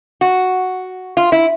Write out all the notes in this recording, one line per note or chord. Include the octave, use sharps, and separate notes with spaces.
F#4
F4
E4